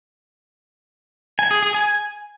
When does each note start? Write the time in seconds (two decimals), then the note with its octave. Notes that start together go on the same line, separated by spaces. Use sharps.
1.39 G#5
1.51 G#4
1.63 G#4
1.74 G#5